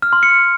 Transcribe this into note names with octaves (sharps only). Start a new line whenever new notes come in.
F6
C6
C#7